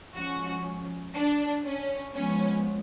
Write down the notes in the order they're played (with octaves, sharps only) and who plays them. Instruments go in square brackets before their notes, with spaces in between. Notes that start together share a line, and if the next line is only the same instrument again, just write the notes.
[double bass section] F3 G#3 C#4 [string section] F#4
[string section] D4
C#4
[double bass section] F3 G#3 B3 [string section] C#4